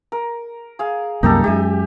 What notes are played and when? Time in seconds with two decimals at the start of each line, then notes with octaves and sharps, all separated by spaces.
0.12 A#4
0.79 G#4 F5
1.23 C2 F#2 A#3 D#4 G4 A4
1.44 F#2 G#3 G4 E5 G#5